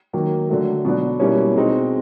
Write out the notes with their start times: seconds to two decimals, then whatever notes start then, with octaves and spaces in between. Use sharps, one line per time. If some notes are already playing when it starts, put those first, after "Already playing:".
0.13 D#3 F#3 A#3
0.49 D3 F#3 A3
0.85 B2 F#3 B3 D4
1.20 B2 G3 A#3 C#4 E4
1.56 B2 G#3 C4 D#4